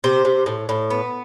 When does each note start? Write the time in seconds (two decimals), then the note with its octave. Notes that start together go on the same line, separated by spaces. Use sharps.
0.04 C3 C5
0.25 C3
0.46 A2
0.69 A2
0.90 B3